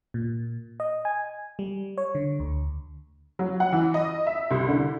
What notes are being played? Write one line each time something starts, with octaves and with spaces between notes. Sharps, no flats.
A#2
D#5
G#5
G3
C#5
D3
D2
F#3
F#5
E3
D#5
E5
C2
D3